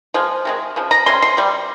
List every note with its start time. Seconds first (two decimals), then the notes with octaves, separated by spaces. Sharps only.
0.14 F3 G#3
0.45 C3 D#3 G#3
0.76 C#3 F3
0.91 A#5
1.06 C3 G3 C#4 C6
1.22 C6
1.37 C3 G3